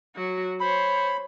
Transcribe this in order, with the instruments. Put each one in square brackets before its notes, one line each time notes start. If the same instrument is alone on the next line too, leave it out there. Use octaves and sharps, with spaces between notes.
[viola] F#3 F#4
[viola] C5 C#5 [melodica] B5